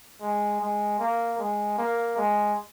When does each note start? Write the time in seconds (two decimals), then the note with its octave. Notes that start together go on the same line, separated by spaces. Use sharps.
0.21 G#3
0.60 G#3
0.99 A#3
1.38 G#3
1.78 A#3
2.17 G#3